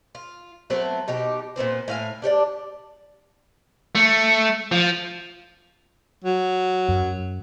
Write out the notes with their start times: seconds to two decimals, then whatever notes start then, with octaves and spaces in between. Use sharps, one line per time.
0.15 F4
0.70 F#3 A3 B3 C4
1.08 B2 D#4 G4
1.56 A#2 B3 C4 C5
1.88 A2 F5 G#5
2.22 D4 G4 C#5 D5
3.95 A3
4.72 F3
6.24 F#3
6.88 F#2